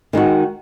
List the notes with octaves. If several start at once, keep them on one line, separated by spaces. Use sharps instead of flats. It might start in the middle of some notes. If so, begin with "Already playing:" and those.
D#3 G#3 D#4 F#4